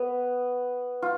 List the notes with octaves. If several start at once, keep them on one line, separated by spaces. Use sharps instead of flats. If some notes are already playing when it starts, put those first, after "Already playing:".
Already playing: B3
F4